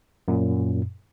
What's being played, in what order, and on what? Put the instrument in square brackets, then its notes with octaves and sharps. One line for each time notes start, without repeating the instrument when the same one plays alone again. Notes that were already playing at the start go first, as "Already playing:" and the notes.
[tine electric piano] F#2 A#2